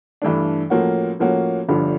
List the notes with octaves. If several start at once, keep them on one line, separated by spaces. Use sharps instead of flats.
G2 E3 A3 D4
A2 F3 A#3 C#4 F#4
A2 F3 A#3 C#4 F#4
G1 G2 D3 F3